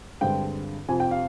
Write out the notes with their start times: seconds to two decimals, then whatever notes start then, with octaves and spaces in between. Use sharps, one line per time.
0.21 G2 D3 G#3 C4 G5
0.88 F2 C3 F3 G#5
1.00 G5
1.11 F5